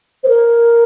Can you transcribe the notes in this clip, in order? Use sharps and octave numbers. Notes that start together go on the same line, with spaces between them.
C5
A#4